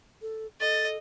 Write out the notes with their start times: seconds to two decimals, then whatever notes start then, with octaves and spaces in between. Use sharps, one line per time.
0.22 A4
0.61 A4 D#5 A6